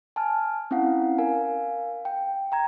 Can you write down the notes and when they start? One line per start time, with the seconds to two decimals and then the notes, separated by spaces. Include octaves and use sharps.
0.16 G#5 A5 F6
0.71 C4 C#4 E4 F5 F#5
1.18 A#4 F5 G#5
2.05 G5
2.52 G5 A#5 G#6